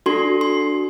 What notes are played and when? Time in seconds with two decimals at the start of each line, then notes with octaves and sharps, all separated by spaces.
0.06 D4 F#4 A4 C6
0.41 C6